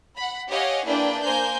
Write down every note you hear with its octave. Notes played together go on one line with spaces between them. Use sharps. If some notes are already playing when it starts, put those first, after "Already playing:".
F#5 B5
G4 C#5 D#5 F5 F#5 G#5
A#3 D4 E4 G#4 B4 G5
A#3 A#4 C5 G#5 G6